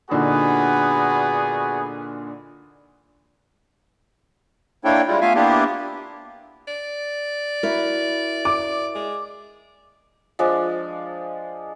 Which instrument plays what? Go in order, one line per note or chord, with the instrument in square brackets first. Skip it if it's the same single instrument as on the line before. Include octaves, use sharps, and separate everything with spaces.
[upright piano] A#2 D3 D#4 [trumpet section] B3 F#4 G#4
[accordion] A#3 D4 E4 A4 C#5 G5
G3 G#3 E4 F4
A3 B3 F4 E5 F5 G#5
A#3 B3 D4 E4 F4 G4
[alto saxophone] D5
[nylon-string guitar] E4 F#4 A#4
[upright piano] D6
[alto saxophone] G#3
[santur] F3 G#3 D4